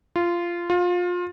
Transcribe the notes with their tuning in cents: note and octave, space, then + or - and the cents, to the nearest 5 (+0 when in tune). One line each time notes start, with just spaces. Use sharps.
F4 -15
F4 +25